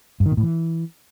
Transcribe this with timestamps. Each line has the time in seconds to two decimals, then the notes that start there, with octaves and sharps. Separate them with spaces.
0.20 G2
0.26 D#3
0.32 A#2
0.37 A2
0.43 E3